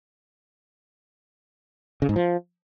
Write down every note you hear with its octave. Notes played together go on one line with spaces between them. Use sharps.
C#3
G#2
F3